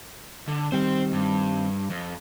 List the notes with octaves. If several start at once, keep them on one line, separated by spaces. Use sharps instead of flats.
D3
D#3 G3 C4 C5 G5
G2
F2